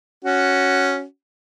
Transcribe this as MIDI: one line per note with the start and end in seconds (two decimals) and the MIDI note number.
0.25 1.04 61
0.25 1.04 66